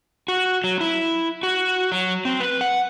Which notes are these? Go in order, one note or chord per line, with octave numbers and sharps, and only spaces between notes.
F#4
F#3
E4
F#4
F#3
C4
B4
F#5